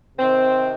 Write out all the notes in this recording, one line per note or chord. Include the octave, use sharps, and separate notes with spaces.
C3 D#3 C4